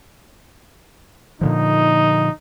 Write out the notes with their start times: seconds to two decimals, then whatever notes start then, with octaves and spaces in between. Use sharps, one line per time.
1.41 A#2 D3 F3 D#4